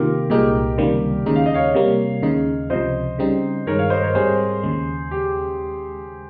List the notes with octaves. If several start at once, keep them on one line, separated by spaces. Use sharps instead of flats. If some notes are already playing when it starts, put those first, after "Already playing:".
Already playing: C3 D#3 A#3 F4 G4 A#4
C2 A#2 G#3 D#4 G4 A#4
C#2 C3 D#3 G3 A#3
D#2 C#3 G#3 D#4
F5
D#5
C#5 F5
C3 G3 A#3
D#2 C#3 G#3 D#4
C#2 C3 F3 C5 D#5
C#3 G3 C4 D#4
G2 D#3 G#3 A#4 C#5
C#5 F5
C5 D#5
A#4 C#5
G#2 G3 C4 G#4 C5
D#2 C#3 G#3
G4